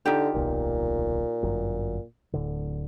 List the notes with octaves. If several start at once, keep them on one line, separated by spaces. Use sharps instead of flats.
D3 D#4 F4 G4
D1 B1 A#2
G1 F#2
D1 A2 D3